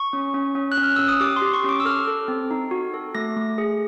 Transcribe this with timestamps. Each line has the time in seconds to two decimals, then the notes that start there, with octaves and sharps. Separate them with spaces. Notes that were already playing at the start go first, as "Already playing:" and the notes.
Already playing: C#6
0.13 C#4
0.34 C#4
0.55 C#4
0.72 F#6
0.78 C#4
0.83 F6
0.96 C#4 E6
1.08 D#6
1.21 G4 D6
1.36 C6
1.42 G4
1.53 C#6
1.64 C#4 D6
1.80 E6
1.85 A4 F6
2.07 A4
2.28 C4
2.51 D#4
2.71 F#4
2.94 A4
3.15 A3 A#6
3.37 A3
3.58 G#4